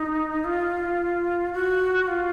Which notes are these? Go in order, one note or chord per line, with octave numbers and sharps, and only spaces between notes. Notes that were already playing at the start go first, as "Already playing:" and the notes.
Already playing: D#4
F4
F#4
F4